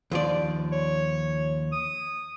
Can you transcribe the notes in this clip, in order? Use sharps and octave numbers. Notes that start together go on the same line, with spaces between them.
D#2 F3 D5
C#5
D#6